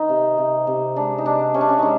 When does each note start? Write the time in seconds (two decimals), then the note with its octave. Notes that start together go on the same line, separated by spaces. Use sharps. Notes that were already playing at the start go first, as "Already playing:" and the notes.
Already playing: D#3 D#4
0.09 C3
0.38 C3
0.67 C3
0.96 G#3 D4
1.18 D#4
1.25 C3 D4
1.54 C3 C#4
1.61 D4
1.69 C#4
1.79 G#3 D4 D#4